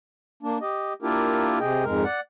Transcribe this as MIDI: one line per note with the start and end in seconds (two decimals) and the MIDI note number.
0.43 0.58 58
0.43 0.58 62
0.61 0.93 67
0.61 0.93 75
1.02 1.59 58
1.02 1.59 62
1.02 1.59 64
1.02 1.59 65
1.02 1.59 67
1.02 1.59 70
1.60 1.84 48
1.60 1.84 68
1.60 1.84 75
1.60 1.84 79
1.84 2.04 41
1.84 2.04 44
1.84 2.04 56
1.84 2.04 70
2.04 2.20 74
2.04 2.20 78